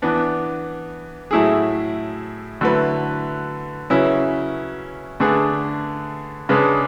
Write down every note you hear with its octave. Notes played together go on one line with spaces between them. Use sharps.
E3 B3 D4
A2 F#3 A3 E4 G#4
D3 F#3 A3 E4 B4
C#3 F#3 C#4 E4 B4
D3 A3 D4 G#4 B4
C#3 G#3 D4 G#4 B4